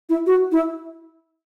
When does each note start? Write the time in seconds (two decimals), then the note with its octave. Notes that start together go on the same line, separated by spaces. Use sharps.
0.09 E4
0.27 F#4
0.52 E4